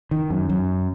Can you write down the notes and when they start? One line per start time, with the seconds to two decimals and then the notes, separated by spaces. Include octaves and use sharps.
0.11 D#3
0.30 F#2
0.49 F#2